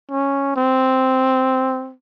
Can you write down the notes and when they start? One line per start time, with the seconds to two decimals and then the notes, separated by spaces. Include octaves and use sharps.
0.11 C#4
0.56 C4